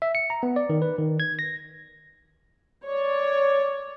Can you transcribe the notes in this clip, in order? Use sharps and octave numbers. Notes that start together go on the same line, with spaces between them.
E5
C#7
A#5
B3
D5
D#3
B4
D#3
G#6
A#6
C#5 D5